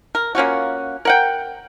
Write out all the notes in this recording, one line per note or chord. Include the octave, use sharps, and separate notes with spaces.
A#4
A#3 C#4 F4 F#4
A#4 F#5 G5